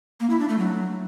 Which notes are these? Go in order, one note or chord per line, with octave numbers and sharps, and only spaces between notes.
A#3
E4
D4
A3
F#3